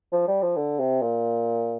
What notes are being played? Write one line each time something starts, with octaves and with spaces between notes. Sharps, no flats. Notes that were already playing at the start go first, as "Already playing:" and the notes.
F3
G3
F3
D3
C3
A#2